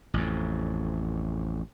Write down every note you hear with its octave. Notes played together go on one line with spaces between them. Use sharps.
A1 F2